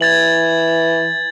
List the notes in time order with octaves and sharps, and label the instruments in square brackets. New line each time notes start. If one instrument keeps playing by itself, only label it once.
[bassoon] E3 [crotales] G#6 A6 F#7